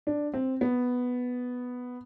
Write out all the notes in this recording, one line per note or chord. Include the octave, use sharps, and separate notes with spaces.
D4
C4
B3